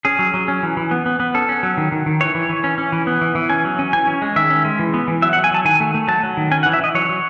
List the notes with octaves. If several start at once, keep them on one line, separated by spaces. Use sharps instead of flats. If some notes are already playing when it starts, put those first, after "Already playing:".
C#4 G#4
F#3
F#3
C#4
E3
E3
B3
B3
B3
C#4 A4
C#4
F#3
D#3
D#3
D#3
E3 C#5
E3
E3
C#4
C#4
E3
B3
E3
E3
C#4 G#5
F#3
C#4
E3 G#5
C#4
G#3
D#3 E5
C#4
G#3
E3
B3
E3
F#3 E5
F#5
F#3
G#5
F#3 A5
D#3 G#5
A3
A3
F#3 A5
F#3
D#3
C#4 G#5
F#5
E3
E5
E3 D#5
F#3 C#5
F#3